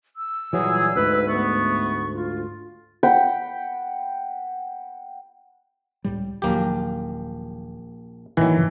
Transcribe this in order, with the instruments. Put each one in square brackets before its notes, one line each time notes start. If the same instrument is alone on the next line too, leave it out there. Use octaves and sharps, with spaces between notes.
[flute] E6
[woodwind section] A#2 G3 G#4 [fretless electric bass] E3 F#3
[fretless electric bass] D2 G#2 [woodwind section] B4
[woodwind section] A3 B3 [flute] C#6
[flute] F4
[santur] F#5 G5 B5
[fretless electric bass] C#2 A2 G3
[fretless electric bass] D#1 D#2 F#3 [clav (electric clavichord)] A#1 A#3 G4
[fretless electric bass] A#1 A2 A#3 [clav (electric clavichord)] D#3 F#3 [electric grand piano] E3
[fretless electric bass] G2 C#3 F3